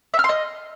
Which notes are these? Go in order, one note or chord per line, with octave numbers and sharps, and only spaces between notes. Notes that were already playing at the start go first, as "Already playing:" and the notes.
E5
F6
C6
D#5